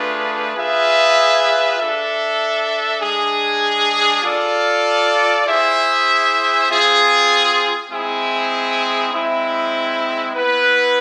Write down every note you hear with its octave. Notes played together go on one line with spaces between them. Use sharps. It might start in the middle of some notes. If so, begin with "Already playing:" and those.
Already playing: A3 D4 F4 G#4 B4
F4 G#4 B4 E5
D4 A4 E5
G#3 D4 G#4
F4 A4 D5 F5
E4 G#4 C5 E5
C4 F4 G#4
G#3 C4 E4 G#4
G#3 C4 E4
B3 E4 B4